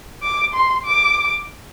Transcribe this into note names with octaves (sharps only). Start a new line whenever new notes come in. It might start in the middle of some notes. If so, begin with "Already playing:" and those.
D6
C6
D6